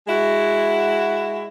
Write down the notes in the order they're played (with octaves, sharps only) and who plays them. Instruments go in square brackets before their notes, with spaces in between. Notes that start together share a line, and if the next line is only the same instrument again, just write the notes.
[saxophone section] G#3 E4 F#4